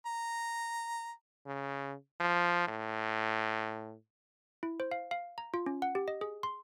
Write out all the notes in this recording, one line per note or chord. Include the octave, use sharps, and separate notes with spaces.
A#5
C#3
F3
A2
E4
C5
F5
F5
A#5
F4
C#4
F#5
G4
D#5
G#4
C6